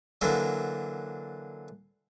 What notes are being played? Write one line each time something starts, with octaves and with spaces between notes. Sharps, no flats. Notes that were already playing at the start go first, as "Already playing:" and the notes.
D3 E3 F#3 A#3 D4